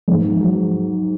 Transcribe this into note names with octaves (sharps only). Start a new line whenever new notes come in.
G#2
F#3